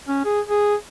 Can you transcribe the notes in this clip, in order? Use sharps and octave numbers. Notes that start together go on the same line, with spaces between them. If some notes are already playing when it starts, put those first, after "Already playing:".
C#4
G#4
G#4